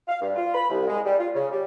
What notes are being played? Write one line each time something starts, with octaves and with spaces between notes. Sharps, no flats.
F5
G2
F4
B5
C2
G#3
G3
F4
C#3
G3